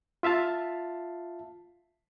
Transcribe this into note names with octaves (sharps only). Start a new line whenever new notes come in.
F4 E5 F5 A5